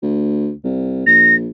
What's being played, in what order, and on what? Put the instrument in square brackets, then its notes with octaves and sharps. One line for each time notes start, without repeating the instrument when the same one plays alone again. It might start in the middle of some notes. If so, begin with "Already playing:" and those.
[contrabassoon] D2
C2
[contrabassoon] A#1 [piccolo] A#6